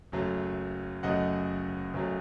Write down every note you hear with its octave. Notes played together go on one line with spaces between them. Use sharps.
F#1 F#2 F#3 A3
F#1 F#2 F#3 A3 D#5 F#5
F#1 F#2 F#3 A3